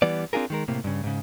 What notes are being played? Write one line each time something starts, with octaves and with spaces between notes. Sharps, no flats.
E3 G3 B3 D5
C4 D4 F4 G#4 A#4
D#3 G#3 A#4
A2 C3 A#3
G2 C#3
G#2 C#3